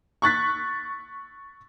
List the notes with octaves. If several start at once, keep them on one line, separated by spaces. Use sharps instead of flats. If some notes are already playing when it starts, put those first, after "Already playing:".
C#6 F#6 A6 B6